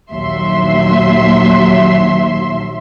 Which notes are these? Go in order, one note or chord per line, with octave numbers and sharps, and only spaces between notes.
A#1 D#2 F#3 E5 C6